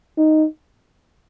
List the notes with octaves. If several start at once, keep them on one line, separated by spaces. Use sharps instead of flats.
D#4